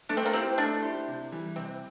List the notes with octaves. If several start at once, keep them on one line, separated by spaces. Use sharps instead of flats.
A3 D4
C4
A#3
C4 E4 G4 C5
A3 D4
E4 G4 C5
C3
E3 G3
C3 C4